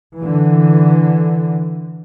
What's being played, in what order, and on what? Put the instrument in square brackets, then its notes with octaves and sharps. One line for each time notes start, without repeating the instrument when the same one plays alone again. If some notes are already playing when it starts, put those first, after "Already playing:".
[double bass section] D3 E3